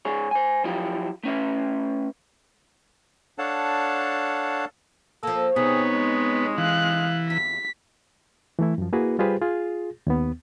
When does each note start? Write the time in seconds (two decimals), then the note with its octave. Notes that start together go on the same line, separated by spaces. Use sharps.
0.05 G#2 G#4 C#5
0.31 C5 G#5
0.64 F3 F#3 E4 F4 G4
1.23 A3 C#4 B4 E5
3.38 D4 A4 C#5 F5 F#5 A5
5.23 F3 A#3 A4
5.56 C3 B3 D#4 G#4 C#5
5.92 G#3
6.58 E3 F5 F#6
7.30 E2 B6
8.59 E3 A3 E4
8.78 F#2 F3
8.93 A#3 E4 F#4 G#4 B4
9.19 G3 F4 G4 G#4 B4 C5
9.41 F4 G#4
10.07 D#2 B3